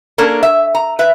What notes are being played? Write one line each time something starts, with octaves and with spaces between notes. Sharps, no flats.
A#3 C#4 D4 A4 A#4
E5
A#5
B4 E5